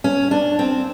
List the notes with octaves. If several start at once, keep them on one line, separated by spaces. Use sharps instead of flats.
C#4
D4
C4